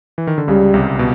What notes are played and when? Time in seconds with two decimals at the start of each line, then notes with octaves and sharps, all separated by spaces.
0.18 E3
0.27 D#3
0.38 D3
0.48 C#2 C#3 G3
0.74 C2 C3
0.99 B2